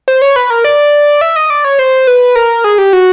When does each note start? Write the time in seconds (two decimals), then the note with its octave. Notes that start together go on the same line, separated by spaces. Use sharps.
0.08 C5
0.22 C#5
0.36 B4
0.50 A#4
0.64 D5
1.21 E5
1.36 D#5
1.50 D5
1.65 C#5
1.79 C5
2.07 B4
2.36 A#4
2.64 G#4
2.78 G4
2.93 F#4